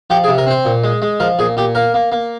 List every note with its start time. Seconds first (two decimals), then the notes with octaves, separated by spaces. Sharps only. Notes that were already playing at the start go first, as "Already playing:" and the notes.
0.10 F3 G4
0.24 G#4
0.28 C3
0.38 A#4
0.47 C4 C5
0.65 A#2
0.84 G#3
1.02 G#3
1.20 F3 A#4
1.39 A#2 G#4
1.57 A#2 G4
1.75 A#3 A#4
1.94 A#3
2.12 A#3